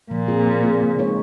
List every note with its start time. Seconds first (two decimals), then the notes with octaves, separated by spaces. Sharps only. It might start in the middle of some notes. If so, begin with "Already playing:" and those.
0.11 A#2 F3
0.28 C4 F4 G#4
0.46 F3
0.63 C4 F4 G#4
0.81 C#3
0.98 G#3 D#4 A#4 C#5